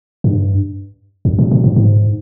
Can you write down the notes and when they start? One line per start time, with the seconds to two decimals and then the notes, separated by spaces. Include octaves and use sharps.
0.24 G2
1.25 F2
1.39 A#2
1.51 A#2
1.64 G#2
1.76 G#2